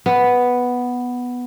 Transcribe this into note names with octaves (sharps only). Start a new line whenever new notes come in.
B3